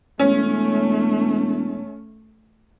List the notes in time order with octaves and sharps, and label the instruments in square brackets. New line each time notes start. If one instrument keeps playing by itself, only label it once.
[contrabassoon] E1 [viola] A3 [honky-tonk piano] C#4